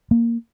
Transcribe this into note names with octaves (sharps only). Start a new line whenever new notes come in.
A#3